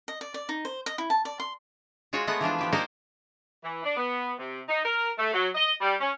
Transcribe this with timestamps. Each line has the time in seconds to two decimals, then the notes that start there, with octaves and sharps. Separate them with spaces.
0.08 D#5
0.21 D5
0.34 D5
0.49 D#4
0.65 C5
0.86 D#5
0.98 E4
1.10 A5
1.25 D5
1.40 C6
2.13 G#3 F4 F#4 C#5
2.27 G#3 A3 B3 F4 D#5 F#5
2.41 E3 F3 D4 F4
2.58 F3 G4 B4
2.73 A#3 D#4 C5 D5 D#5 F#5
3.63 E3
3.84 D4
3.97 B3
4.38 C3
4.69 D#4
4.85 A#4
5.19 A3
5.33 F#3
5.55 D#5
5.81 G3
6.01 C#4